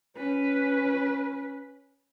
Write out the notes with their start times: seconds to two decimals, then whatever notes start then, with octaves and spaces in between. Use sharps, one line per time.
0.17 C#4 B4